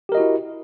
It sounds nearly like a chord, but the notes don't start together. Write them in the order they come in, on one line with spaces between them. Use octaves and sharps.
G4 A#4 D#5 F#4 E4